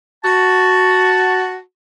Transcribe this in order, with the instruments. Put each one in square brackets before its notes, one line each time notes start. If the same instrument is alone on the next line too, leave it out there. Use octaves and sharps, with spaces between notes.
[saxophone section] F#4 [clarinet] A5